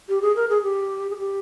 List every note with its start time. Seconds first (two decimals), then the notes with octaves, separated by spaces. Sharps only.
0.09 G4
0.22 G#4
0.36 A#4
0.49 G#4
0.63 G4
1.10 G#4
1.18 G4